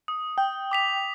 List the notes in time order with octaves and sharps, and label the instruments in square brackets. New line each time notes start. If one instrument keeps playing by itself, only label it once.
[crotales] D#6
[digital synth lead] G5
[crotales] D6 B6 F7